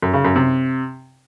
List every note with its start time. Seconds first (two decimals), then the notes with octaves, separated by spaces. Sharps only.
0.02 F#2
0.14 C#3
0.25 F#2
0.36 C3